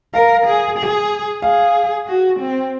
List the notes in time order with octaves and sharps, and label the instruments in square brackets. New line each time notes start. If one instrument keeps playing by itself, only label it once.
[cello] A#4 [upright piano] F5
[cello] G#4
G#4
[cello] G#4 [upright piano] F5
[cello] F#4
C4